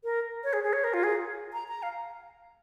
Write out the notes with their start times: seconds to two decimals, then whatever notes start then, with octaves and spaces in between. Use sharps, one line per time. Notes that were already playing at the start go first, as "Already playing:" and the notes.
0.04 A#4
0.44 C#5
0.53 G#4
0.63 G#4
0.73 C#5
0.84 A#4
0.94 F4
1.03 G#4
1.53 A#5
1.68 A#5
1.83 F5